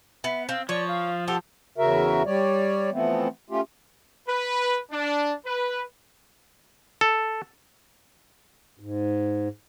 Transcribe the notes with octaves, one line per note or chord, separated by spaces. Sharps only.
B3 E5
C4 F5
F3 C#5 D5
F5
G4 A4 C5 F#5
E2 C#3 F#4 A#4 E5
G3 C#5 D5
E3 F3 A3 B3 C4
A3 C#4 F4 G4
B4
D4
B4
A4
G#2